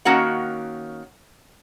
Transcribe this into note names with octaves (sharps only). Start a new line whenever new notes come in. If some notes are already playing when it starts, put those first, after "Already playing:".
D#3 A#3 C#4 F#4 F#5